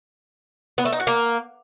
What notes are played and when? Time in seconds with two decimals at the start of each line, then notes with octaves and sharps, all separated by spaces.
0.78 B3
0.85 A3
0.92 D#4
1.00 F#4
1.07 A#3